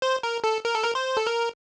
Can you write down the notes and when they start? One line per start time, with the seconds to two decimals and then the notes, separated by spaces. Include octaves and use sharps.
0.02 C5
0.23 A#4
0.44 A4
0.65 A#4
0.74 A4
0.84 A#4
0.95 C5
1.17 A4
1.27 A#4